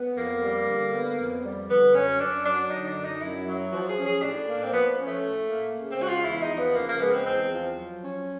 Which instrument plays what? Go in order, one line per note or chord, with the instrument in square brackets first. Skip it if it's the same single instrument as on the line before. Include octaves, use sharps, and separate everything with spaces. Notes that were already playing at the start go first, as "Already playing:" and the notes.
Already playing: [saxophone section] B3
[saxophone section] F2 [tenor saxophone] A#3
[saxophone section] G3
D3
B3
F2
G3
[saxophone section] D3 [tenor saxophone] B3
[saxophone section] F#2 [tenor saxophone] C#4
[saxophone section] F#2 [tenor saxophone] D4
[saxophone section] F#3 [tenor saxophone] D4
[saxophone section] D3 [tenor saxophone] D#4
[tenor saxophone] D4
[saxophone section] F#2
[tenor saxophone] D#4
[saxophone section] F#2 [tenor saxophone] E4
[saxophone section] F#3
[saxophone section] F3 [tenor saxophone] F#4
[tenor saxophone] G#4
[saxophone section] C#4
[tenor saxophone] G#4
[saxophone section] A2 [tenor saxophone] D4
[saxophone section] A#3
[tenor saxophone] C4
[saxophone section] F3 [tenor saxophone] B3
[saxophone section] C#4
[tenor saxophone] A3
[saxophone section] A2
A#3
C#3
[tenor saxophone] C4
[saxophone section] G#3 [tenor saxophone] F#4
[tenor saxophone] F4
[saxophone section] E2 [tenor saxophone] E4
[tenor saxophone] D#4
[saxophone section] F3
[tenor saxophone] B3
[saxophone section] C#3 [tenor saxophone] A#3
[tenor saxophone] A#3
[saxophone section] G#3 [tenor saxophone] B3
[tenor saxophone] C4
[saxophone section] E2 [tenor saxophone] C4
[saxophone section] F3
F#3
C#4